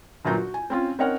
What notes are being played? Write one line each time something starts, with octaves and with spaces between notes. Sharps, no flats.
G1 A#2 F#3 A#5 G6
F#4
G#5
C4 C#4 F4
C4 C#4 D#4 A#4 C#5 F#5